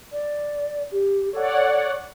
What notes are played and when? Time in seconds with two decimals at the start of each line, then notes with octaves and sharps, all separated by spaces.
0.12 D5
0.91 G4
1.33 A4 C#5 D5 F#5